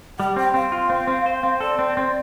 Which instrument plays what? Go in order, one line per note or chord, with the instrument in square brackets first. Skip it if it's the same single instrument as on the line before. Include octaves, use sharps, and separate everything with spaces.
[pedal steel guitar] G3 [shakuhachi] G5
[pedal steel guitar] C4 [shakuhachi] G5
[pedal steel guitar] C4 [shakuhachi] F5
[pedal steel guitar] F4
C4
C4
C5
C4
[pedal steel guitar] A4 [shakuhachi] D5
[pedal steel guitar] C4
C4